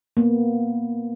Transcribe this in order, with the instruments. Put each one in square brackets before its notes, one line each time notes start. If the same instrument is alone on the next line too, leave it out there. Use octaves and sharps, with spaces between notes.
[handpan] A#3 B3